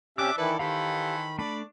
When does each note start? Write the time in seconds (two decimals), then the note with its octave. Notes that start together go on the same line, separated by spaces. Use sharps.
0.18 C3 C#4 D4 G4 E5 D6 E6 F#6
0.38 D#3 E3 E4 A4 B4 D5
0.59 D#3 E3 G4 A4 C5 F5 B5
1.39 A3 D4 D5 B5